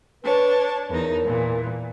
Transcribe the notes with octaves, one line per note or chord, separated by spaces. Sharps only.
D4 B4 C#5 A5
E2 D#3 D#4 A#4
A#2 E3